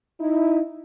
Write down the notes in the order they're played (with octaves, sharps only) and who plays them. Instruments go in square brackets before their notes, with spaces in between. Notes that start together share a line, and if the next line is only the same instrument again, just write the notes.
[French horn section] D#4 E4